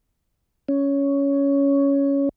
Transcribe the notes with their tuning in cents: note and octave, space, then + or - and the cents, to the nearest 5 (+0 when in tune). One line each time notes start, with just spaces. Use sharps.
C#4 +10